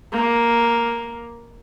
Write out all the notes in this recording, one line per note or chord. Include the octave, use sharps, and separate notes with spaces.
A#3